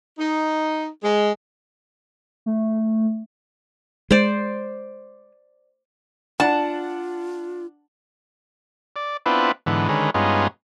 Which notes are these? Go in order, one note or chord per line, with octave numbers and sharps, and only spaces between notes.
D#4
G#3
A3
G#3 C5 D5
D4 F4 F#5 A5
D5
B3 C4 D4 E4 F4 B4
G#2 D3 E3 B3
D3 D#3 G#3 C#4 B4
G2 G#3 B3 C#4 D#4 F4